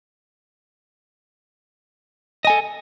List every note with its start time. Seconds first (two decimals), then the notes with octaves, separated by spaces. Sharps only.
2.45 D#5
2.47 G#5
2.50 A4